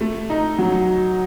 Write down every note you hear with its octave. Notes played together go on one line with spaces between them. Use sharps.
A3
D#4
F#3